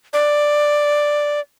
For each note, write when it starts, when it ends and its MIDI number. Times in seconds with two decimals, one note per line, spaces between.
0.13 1.40 74